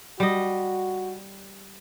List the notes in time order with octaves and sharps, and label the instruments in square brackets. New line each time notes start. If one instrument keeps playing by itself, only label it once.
[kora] G3 D#5 [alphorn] F#4